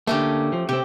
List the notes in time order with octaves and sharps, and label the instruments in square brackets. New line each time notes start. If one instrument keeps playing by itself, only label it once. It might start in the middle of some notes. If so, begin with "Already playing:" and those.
[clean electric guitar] D3 A#3 [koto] A3 C#4 G4
[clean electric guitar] F3
[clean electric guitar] C3 C4 [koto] G4